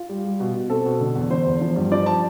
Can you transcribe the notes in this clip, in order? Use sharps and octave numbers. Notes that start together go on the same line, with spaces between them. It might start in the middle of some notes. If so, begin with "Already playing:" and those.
Already playing: F4
G3
G3
B2
B2
C4 A4
B2
D3
E2
D3 C5
E2
F3
G2
F3 D5
A5